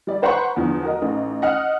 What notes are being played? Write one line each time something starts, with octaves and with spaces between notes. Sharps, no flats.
G3 D5
B4 C5 F#5 A#5 B5 C#6
E2 D3 F3
F#4 A#4 D#5
A1 D#4
D#5 F#5 F6